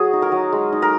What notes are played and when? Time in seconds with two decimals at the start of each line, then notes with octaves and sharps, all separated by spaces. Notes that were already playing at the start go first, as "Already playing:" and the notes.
Already playing: F#3 F#4 G#4
0.13 D#4
0.22 A#4
0.32 F#3
0.52 G#3
0.72 D#4
0.82 A#4